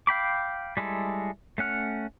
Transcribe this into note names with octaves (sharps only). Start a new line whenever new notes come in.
F5 G5 B5 D6
G3 G#3 E4 A4
A3 C#4 F#5 F6